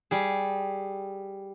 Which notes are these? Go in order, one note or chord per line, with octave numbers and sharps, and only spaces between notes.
G3 G#4